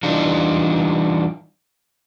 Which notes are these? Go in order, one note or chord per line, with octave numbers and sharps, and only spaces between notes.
E3 G3 D4 D#4 F4